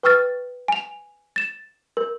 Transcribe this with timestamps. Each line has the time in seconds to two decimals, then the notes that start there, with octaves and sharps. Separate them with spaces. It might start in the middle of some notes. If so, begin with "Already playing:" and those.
0.03 B4 G5 C#6 E6 F6 A6
0.68 G#5 F7
1.36 A6 E7
1.97 A#4